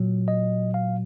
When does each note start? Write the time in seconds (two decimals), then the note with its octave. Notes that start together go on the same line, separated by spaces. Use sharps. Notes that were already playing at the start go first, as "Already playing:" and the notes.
Already playing: A#2 F#3
0.28 D#5
0.74 F5